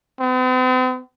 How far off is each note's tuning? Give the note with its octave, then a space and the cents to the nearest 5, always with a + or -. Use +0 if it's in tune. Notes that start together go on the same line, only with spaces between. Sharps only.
C4 -45